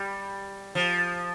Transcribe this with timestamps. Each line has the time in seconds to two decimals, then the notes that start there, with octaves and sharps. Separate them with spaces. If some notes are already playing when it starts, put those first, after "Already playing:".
Already playing: G3
0.75 F3